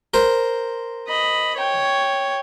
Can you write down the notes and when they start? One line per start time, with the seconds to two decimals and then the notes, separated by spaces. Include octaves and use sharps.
0.14 A#4 C5
1.08 D#5 B5
1.56 C#5 G5